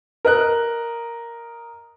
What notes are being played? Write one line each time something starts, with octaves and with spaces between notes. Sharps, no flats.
A#4 D#5 F#6